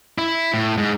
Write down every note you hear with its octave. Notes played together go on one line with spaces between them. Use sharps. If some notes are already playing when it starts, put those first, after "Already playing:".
E4
A2
G#2